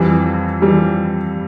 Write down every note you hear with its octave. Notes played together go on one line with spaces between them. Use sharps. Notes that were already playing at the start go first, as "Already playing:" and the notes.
Already playing: F2 E3 G3
E3 G3